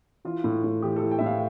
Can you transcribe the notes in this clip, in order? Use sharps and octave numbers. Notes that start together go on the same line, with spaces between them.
E3 F4
A2
A2
E3 G4
A4
E3
G5
A2 E5
F5